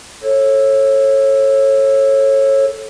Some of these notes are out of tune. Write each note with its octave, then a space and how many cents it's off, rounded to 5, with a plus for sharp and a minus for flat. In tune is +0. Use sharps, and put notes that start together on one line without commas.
A4 +0 C#5 -25